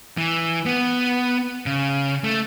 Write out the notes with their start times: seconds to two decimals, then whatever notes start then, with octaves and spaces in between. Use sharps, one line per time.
0.17 E3
0.66 B3
1.66 C#3
2.24 A3